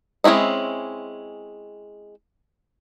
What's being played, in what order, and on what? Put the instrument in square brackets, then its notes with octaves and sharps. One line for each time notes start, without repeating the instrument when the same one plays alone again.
[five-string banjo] G#3 C4 C#4 E4 D#5